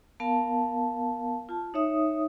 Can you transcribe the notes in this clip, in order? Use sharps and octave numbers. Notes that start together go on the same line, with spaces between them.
B3 A#4 F5 A5
F4 A5
D#4 C#5 E5 D#6